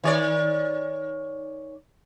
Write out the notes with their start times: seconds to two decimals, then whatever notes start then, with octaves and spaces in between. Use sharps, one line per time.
0.04 D#3 C#5 D5